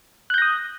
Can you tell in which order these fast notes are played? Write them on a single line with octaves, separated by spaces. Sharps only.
F#6 G6 A#6 D#6